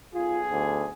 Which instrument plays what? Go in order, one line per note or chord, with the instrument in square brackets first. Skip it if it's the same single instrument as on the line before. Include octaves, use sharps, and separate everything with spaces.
[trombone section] B1 G#4 [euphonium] F4
[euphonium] D2